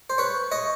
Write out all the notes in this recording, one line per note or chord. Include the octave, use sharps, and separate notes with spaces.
C5
B4 C#5
C#5 D#5